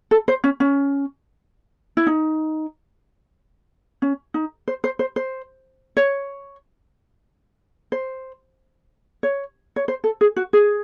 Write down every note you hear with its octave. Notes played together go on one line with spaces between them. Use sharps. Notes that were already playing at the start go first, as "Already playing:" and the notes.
A4
C5
C#4
C#4
E4
D#4
C#4
D#4
C5
C5
C5
C5
C#5
C5
C#5
C#5
C5
A4
G#4
F#4
G#4